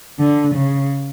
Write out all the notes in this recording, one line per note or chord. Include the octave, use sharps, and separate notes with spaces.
D3
C#3